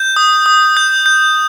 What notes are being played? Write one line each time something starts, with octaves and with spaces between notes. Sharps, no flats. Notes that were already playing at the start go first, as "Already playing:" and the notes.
Already playing: G6
D#6
D#6
G6
G6